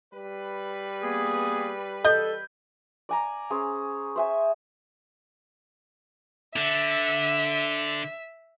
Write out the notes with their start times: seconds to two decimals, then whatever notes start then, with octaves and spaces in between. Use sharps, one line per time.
0.13 G3 B4
1.03 A#3 B3 G#4
2.05 A4 D#5 G6
3.09 D5 G#5 A#5
3.50 C#4 G#4 C5
4.16 C5 E5 G#5
6.56 D3 E5